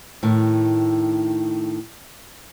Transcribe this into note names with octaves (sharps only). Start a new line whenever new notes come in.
A2 D#3